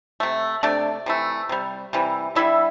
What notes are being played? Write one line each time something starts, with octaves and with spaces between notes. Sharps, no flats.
C3 A3
C3 A3 D4 D5
C3 E3 A3
C3 G3
C3 E3 G3
D3 G3 E4 E5